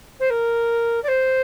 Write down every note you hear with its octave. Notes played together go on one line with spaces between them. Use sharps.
C5
A#4
D5
C5